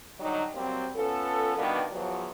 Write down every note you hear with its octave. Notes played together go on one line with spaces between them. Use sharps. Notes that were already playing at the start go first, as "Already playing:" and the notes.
D3 F#3 G3 D#4
F#3 G3 A#3 C4
B3 C#4 F4 A4
B2 D#3 G3 A#3 B3 D4
E2 F3 F#3